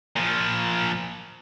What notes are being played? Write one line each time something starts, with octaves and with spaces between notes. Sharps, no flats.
A#2 F3